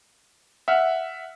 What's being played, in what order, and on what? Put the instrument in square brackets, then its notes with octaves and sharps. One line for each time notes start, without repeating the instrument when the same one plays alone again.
[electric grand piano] E5 F#5 F6